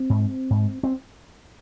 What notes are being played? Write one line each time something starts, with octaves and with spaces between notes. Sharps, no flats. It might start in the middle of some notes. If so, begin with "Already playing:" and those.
Already playing: C4
G#2
G#2
C4